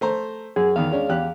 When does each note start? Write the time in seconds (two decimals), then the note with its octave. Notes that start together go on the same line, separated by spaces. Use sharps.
0.01 A3 C5 A#5
0.56 F#2 G#4
0.76 E2 D#3 F5
0.91 G#3 C#4 D4
1.09 E2 G4 F#6